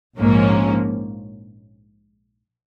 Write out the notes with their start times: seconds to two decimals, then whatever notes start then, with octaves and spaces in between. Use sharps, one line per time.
0.19 A#1 G#2 F3 A#3 C#4